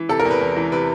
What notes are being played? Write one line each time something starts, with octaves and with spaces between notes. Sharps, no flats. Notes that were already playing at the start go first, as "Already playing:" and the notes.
Already playing: E3
C3 A4
A#4
E2
B4
E2
E3
C3 B4